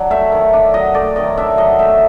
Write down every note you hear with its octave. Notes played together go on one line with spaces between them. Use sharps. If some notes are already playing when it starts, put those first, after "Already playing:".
Already playing: F#3 D4
A3 E5
D#3
D4
F#3 D#5
A3 D5
D#3 D#5
D4 E5
F#3 D#5
A3 E5